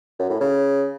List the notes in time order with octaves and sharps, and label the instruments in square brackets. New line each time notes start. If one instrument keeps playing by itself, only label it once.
[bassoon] F#2
A2
C#3